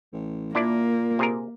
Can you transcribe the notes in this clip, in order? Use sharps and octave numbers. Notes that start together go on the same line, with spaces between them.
A1
A#2 A#3 D4 E4 D5
C3 G#4 A#4